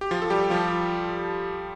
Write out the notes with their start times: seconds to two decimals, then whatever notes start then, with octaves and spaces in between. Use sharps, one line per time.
0.01 G4
0.11 F3 F4
0.22 A4
0.30 G3 G4
0.50 F3 F4